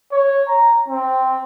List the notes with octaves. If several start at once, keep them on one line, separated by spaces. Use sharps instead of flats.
C#5
A#5
C4